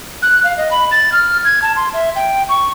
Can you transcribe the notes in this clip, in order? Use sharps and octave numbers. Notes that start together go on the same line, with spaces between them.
F#6
F5
D#5
B5
A6
F6
G#6
A5
C6
E5
G5
C#6